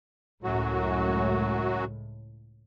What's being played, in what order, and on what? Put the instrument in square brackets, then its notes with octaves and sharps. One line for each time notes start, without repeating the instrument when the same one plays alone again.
[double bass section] C#2 A2 [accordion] F#2 F#3 F#4